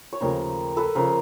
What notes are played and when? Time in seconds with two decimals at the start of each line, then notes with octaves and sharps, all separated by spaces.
0.13 C#5
0.21 D#2 C#3 F3 A3 A#4 C5
0.77 A4 B4
0.95 C#3 F3 A#4 C5